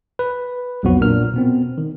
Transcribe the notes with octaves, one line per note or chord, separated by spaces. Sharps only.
B4
B1 F2 F3 F#3 B3 F#4
A#2 D4 A#4 F6
B2 B3 C4
D#3